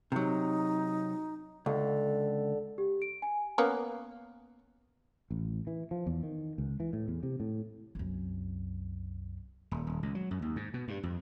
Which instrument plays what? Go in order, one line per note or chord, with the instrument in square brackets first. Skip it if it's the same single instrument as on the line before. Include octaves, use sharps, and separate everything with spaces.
[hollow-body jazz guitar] C3 F#3 [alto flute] D#4
[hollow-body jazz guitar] C#2 [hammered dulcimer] D3 [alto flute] A4
[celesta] G4
D7
G#5
[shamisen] A#3 B3 C#4
[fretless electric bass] A1
E3
F3
E2
D#3
C#2
E3
A2
E2
C3
A2
[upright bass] C2 F#2
[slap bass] D#1
D#1
C#2
F#3
F#2
D#2
G#2
B2
G2
F2